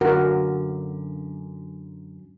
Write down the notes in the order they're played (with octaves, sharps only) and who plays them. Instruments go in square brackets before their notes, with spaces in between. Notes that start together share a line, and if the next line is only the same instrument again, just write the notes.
[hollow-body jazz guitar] F#2 D3 [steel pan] F#4 A#4